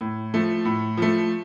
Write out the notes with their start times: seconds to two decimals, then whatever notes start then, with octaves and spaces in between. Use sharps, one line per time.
0.01 A2
0.34 F3 A3
0.65 A2
0.97 F3 A3